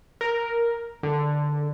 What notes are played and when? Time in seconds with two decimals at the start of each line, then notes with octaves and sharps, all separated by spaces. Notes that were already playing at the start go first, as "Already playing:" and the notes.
0.21 A#4
1.03 D3